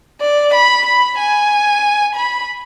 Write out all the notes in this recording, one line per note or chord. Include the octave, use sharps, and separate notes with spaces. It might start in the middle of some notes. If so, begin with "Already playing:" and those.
D5
B5
B5
G#5
B5